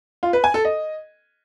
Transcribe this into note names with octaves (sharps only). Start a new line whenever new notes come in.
F4
B4
G#5
A4
D#5